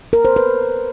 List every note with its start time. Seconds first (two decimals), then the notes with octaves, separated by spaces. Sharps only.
0.13 A#4
0.25 C5
0.36 B4